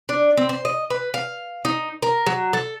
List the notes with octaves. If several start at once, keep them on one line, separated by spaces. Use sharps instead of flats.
D4
C4
C5
D#5
B4
F5
D#4
A#4
F#3
A4